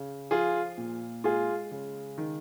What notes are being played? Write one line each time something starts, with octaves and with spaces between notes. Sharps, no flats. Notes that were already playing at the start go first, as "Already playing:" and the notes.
Already playing: C#3
F3 F4 G#4
A#2
G#3 F4 G#4
C#3
D#3